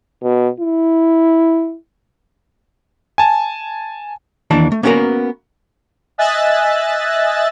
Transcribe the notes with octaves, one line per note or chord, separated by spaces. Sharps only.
B2
E4
G#5 A5
D#2 E3 D4 A5
A3
A#3 B3 C#4 D#4 F#4 A#4
D#5 E5 G#5 E6 F#6 A6